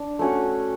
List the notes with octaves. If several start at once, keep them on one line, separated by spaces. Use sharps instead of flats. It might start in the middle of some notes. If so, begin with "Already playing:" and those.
Already playing: D4
A3 C#4 F#4